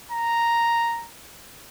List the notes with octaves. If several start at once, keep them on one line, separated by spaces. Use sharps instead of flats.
A#5